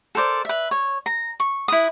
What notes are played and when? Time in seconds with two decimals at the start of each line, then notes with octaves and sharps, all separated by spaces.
0.15 A4 A#4 C5 D5
0.45 B4 E5
0.71 C#5
1.06 A#5
1.40 C#6
1.68 E4 B4 D#6